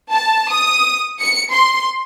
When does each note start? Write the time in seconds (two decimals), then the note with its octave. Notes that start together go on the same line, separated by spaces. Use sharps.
0.12 A5
0.51 D#6
1.21 C#7
1.53 C6